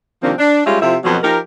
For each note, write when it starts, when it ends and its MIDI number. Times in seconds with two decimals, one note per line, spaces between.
0.23 0.34 48
0.23 0.34 51
0.23 0.34 53
0.23 0.34 58
0.23 0.34 60
0.23 0.34 62
0.38 0.62 62
0.66 0.81 55
0.66 0.81 56
0.66 0.81 61
0.66 0.81 65
0.66 0.81 67
0.66 0.81 76
0.81 0.96 48
0.81 0.96 53
0.81 0.96 64
0.81 0.96 65
0.81 0.96 69
0.81 0.96 76
1.04 1.18 41
1.04 1.18 47
1.04 1.18 54
1.23 1.38 53
1.23 1.38 63
1.23 1.38 67
1.23 1.38 70